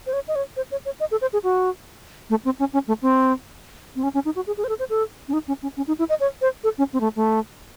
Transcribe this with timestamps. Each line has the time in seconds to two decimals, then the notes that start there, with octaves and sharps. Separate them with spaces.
0.06 C5
0.13 C#5
0.28 D#5
0.35 C#5
0.56 C5
0.71 C#5
0.85 C#5
1.00 D#5
1.11 A4
1.21 C5
1.33 G#4
1.43 F#4
2.30 A3
2.45 C4
2.59 C#4
2.73 C#4
2.88 A3
3.02 C4
3.96 C4
4.03 C#4
4.14 C#4
4.25 D#4
4.36 F#4
4.47 G#4
4.57 G#4
4.64 C5
4.69 A4
4.79 C5
4.89 A4
5.28 C#4
5.33 D#4
5.48 C#4
5.62 C#4
5.77 C#4
5.87 D#4
5.99 E4
6.09 D#5
6.20 C#5
6.41 C5
6.63 A4
6.78 C#4
6.93 C4
7.00 A3
7.16 A3